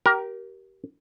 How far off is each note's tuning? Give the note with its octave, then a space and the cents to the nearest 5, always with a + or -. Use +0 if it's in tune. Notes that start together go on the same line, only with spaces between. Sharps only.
G4 -25 A#4 +15